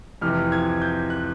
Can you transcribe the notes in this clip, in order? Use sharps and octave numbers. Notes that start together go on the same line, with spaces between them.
F2 C3 E3 F6
G#6
G6
F#6